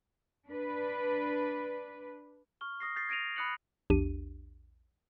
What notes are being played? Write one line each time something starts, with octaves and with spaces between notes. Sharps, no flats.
D4 B4
C#6 F6 G7
D#6 A#6 C7
G6 A6 C7
G#6 A#6 D7 D#7 F7
B5 D#6 F#6 C#7 F#7
A#1 E2 D4 G4 D#7